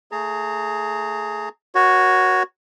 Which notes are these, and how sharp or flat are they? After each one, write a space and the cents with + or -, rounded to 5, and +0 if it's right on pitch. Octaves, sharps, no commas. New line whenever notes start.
A3 +15 G#4 +15 A#5 -25
F#4 +0 A#4 +35 C#5 +0